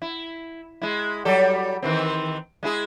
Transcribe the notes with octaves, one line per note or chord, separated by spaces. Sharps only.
E4
G#3 E4
F#3 G3 A4
D#3 E3 C4
G#3 E4 G#4